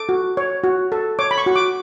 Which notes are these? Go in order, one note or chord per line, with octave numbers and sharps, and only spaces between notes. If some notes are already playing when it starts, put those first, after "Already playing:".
Already playing: A4 D6
F#4
C#5
F#4
A4
C#5 D6
B5
C#6
F#4
D6